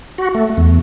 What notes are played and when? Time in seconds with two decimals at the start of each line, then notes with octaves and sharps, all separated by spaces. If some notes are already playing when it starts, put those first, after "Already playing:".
0.18 F#4
0.35 A3
0.57 E2